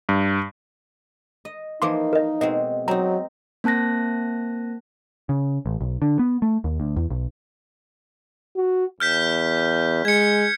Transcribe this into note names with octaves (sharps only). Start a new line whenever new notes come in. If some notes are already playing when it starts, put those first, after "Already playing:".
G2
D#5
E3 F3 A#3 D#4 C6 D6
A#4 D#5
B2 G#3 C4 D#5
F#3 C4 D#4 A#5
A#3 C4 A5 F#6 A#6
C#3
A1
B1
D3
B3
A3
D#2
D2
E2
B1
F#4
E2 F6 G6 B6
G#3 G#6 C#7